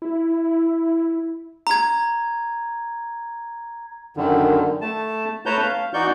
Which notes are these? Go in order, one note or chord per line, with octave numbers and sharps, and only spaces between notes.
E4
A#5 G#6
F#2 D3 D#3
A3 A5
A3 B4 C#5 A5 A#5 G6
F5
E3 D#4 F#4 D5 C#6 G6